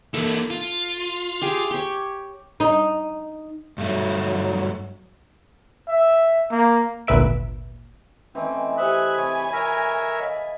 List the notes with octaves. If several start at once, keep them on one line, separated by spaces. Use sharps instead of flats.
E3 A#3 A4
F4
G4 G#4
G4 C#5
D#4
G2 F#3 A3
E5
A#3
G#1 D2 A#2 B4 E5 D7
E3 A3 C4 C#4 D#5 G#5
G4 C5 E5 G#5 B5 D#6 F#6
C3 C#5
A#4 C#5 E5 A#6
D#5 F5